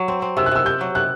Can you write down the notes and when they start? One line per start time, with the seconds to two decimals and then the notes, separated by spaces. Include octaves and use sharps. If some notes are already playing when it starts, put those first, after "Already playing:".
Already playing: F#3
0.08 C4
0.22 C4
0.37 C3 E6
0.46 F#6
0.51 C3 E6
0.66 C3 G6
0.81 F#3
0.95 C3 F#6